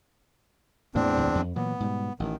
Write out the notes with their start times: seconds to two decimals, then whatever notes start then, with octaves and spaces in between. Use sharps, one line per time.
0.95 E2 A2 E3 A#3 C4 D4
1.16 C#2 A2 F#3
1.35 F2
1.56 A#2 E3 F#3 B3
1.80 G#2 B2 G3
2.20 A1 D#3